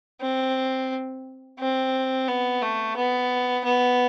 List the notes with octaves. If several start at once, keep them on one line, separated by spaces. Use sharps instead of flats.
C4
C4
B3
A3
B3
B3